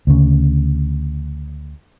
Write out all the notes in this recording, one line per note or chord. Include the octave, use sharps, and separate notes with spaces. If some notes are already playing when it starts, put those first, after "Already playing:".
D2 C#3